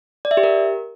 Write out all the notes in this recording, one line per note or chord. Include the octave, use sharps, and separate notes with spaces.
D5
E5
G4
A#4